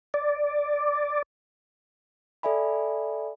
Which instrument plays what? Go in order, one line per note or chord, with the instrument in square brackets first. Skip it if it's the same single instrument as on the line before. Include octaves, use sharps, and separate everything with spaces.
[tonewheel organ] D5
[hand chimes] A4 D5 E5 G#5 B5